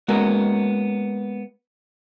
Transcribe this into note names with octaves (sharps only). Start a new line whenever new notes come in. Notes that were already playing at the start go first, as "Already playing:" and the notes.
G#3 A#3 B3 C#4 F#4 A#4